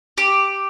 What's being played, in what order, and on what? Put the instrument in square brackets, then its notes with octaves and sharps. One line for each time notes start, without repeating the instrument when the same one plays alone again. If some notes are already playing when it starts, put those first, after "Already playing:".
[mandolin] G4